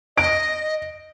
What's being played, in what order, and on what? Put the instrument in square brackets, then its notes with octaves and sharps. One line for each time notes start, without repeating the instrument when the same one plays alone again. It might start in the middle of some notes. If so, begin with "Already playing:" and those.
[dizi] D#5 [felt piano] D7